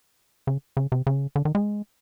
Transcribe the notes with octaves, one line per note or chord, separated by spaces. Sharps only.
C#3
C#3
C3
C#3
D3
D#3
G#3